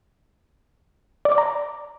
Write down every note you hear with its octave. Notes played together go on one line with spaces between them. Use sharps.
D5
D6
A#5